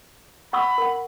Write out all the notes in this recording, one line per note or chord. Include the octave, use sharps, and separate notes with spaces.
F#5 B5 C#6 E6
A#4 F#5